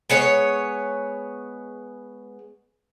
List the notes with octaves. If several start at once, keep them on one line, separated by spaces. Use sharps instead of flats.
G#3 B3 C#5